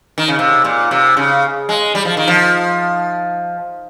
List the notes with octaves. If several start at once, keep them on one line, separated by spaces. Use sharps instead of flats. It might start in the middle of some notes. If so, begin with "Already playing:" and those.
D#3
C#3
C3
A#2
C3
C#3
G#3
G3
F3
D#3
F3